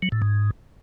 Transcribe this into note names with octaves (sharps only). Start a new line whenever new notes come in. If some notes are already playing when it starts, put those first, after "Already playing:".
F#3
A2
G#2